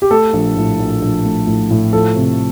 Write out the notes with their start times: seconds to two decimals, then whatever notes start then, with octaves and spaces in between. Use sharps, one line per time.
0.02 G4
0.11 A3 A4
0.33 A#1
0.56 A2
0.79 A#1
1.02 A#1
1.25 A3
1.47 A2
1.71 A2
1.93 F3 A4
2.16 C3